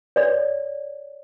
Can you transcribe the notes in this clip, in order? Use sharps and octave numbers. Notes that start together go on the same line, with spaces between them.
C#5 D5